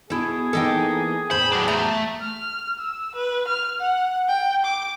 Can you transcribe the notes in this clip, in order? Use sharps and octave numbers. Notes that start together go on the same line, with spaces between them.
B2 E4 G#4 A4
E3 A#3 D#4 A4 D#5 G5
E2 A2 C5 G5 B5
F#3 D4
A3 A#5
F6
E6
B4
F6
F#5
G5
D6